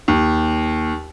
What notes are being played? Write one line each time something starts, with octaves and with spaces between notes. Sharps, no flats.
D#2